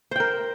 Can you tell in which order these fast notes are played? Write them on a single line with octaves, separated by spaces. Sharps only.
C5 G5 A#4